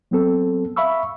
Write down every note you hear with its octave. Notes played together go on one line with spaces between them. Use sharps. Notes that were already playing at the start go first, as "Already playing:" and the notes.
F#3 B3 C4 A4
E5 F5 B5 C#6 E6